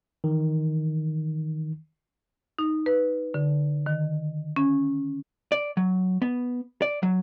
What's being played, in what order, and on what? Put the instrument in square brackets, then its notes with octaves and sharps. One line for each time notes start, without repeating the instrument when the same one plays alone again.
[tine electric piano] D#3 E3
[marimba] D#4
B4
D3
D#3
C#4
[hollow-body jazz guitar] D5
F#3
B3
D5
F#3